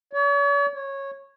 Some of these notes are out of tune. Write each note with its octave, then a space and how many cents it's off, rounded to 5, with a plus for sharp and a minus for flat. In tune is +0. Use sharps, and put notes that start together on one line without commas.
C#5 +45
C#5 -15